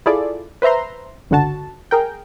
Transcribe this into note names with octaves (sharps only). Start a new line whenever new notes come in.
E4 F4 G#4 A4 D5
B4 C5 E5 A#5 C6
G1 C#2 D3 F#4 A5
G#4 A#4 G5